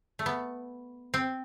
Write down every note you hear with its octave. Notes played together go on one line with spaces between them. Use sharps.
A3
B3
C4